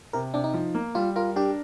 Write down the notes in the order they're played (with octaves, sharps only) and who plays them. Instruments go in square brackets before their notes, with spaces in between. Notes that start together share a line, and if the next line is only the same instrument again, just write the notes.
[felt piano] C3 [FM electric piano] A#4
[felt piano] C3 [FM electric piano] D4
[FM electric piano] D#4
[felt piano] F3
A#3
[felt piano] G3 [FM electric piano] F4
[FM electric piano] F4 [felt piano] A#4
[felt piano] D4 [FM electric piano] G4